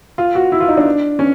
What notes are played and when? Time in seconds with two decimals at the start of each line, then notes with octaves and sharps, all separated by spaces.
0.18 F4
0.35 F#4
0.52 E4
0.60 F4
0.68 D#4
0.77 D4
1.19 C#4